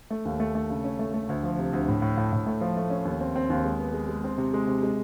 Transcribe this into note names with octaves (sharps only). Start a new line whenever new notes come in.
A3
D#2
A3
A3
C#3
C#4
A3
A3
D2
F3
C3
D2
A2
A2
A2
A2
A3
F3
A3
C#4
D#2
C4
C4
D#2
G#3
B3
G#3
G#3
C4
C3
G#3
C3
G#3